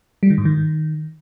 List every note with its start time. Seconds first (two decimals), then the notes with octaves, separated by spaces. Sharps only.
0.23 G3
0.30 D#3
0.38 G#2
0.45 D#3